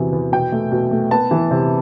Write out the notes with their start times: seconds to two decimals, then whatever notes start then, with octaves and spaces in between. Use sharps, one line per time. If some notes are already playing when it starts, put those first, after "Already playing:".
Already playing: E2 C3 F#3
0.12 E2
0.32 B2 G5
0.52 A3
0.72 B2
0.91 A3
1.11 B3 A5
1.31 E3
1.51 C3